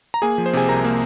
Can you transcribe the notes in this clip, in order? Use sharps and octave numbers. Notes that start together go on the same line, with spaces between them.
A#5
A#3 G#4 G#5
F3
C5
C3 G#4 G#5
C2 A#4 A#5
A#3